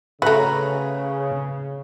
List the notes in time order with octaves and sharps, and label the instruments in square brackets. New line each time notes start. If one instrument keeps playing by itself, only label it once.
[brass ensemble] C#3 [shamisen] A3 F#4 [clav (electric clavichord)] B4 A#5